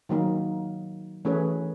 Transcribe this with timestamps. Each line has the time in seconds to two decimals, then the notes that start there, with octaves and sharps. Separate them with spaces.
0.09 D#3 F#3 A#3 D#4
1.25 E3 A3 C#4 G#4 B4 C#5